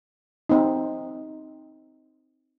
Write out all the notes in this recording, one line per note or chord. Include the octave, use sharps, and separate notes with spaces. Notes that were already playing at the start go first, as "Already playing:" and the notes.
C4 D#4